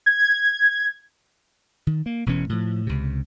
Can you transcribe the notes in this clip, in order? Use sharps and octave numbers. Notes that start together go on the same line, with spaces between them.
G#6
D#3
A#3
E1 B2 E3 C#4
A2 F3
C#2 C3